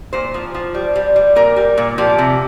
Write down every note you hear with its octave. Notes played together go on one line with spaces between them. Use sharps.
A#2 C5
F3
F3
G3
G3
G3
A#2 A#4
G3
A#2
F3 G4
C3